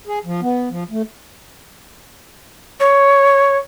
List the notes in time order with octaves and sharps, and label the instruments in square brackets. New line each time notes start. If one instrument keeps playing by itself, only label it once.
[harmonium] G#4
F3
B3
F3
A3
[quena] C#5